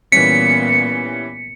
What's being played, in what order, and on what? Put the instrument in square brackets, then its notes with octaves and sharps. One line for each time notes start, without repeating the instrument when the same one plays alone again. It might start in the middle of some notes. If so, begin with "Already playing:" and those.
[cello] A#2 B3 [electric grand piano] E3 G3 C#4 [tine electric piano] B6 [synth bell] C#7